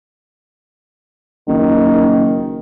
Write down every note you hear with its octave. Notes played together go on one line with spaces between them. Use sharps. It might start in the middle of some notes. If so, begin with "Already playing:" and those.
F#1 D#3